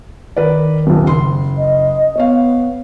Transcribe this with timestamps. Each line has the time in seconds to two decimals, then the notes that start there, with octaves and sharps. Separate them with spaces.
0.37 D#3 A#4 B4 D5
0.87 D#1 B1
1.05 F#1 C6
1.58 D#5
2.18 B3 C#5 F5